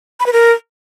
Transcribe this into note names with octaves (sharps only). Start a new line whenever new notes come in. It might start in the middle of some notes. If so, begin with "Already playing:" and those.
B5
B4
A#4